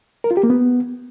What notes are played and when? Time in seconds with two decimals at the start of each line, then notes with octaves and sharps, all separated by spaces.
0.24 A#4
0.31 F4
0.37 G4
0.43 A#3
0.50 B3